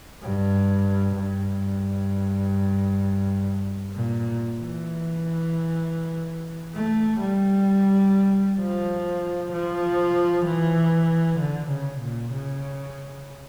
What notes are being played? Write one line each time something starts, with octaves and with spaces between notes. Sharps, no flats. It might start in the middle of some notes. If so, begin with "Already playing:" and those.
G2
G2
A#2
E3
A3
G3
F3
F3
E3
D3
C#3
A#2
C#3